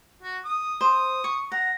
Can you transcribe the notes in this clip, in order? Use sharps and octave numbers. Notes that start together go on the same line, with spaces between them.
F#4
D#6
C5 D#6
C#6
F#5 A#5